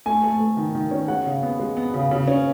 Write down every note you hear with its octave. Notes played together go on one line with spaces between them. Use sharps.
A3 G#5
A3
A3
D#3
D#3
C#4
G#3 F#5
C#3
B3
G#3
B3
C#3
C#3
C#4